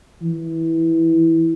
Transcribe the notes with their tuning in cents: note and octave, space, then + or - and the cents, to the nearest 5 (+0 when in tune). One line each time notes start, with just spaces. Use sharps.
E3 -10